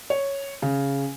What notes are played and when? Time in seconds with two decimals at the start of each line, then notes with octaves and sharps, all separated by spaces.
0.10 C#5
0.62 C#3